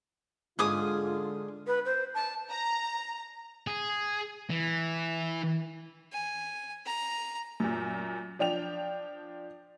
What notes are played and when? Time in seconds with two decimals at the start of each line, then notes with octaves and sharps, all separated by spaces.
0.59 G#2 D3 F4 G#4 D6 D#6
1.67 B4
1.86 C5
2.14 A5
2.50 A#5
3.67 G#4
4.50 E3
6.13 G#5
6.86 A#5
7.60 F#2 A#2
8.39 F3 D4 G5 F7